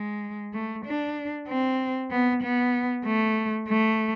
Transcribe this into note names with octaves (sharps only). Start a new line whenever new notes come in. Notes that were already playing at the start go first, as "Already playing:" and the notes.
Already playing: G#3
A3
D4
C4
B3
B3
A3
A3